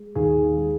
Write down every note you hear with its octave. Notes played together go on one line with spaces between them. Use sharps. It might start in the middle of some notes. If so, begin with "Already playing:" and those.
Already playing: G#3
D#2 G#4
G#3